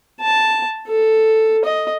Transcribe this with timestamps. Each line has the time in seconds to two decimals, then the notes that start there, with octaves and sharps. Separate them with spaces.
0.21 A5
0.87 A4
1.64 D#5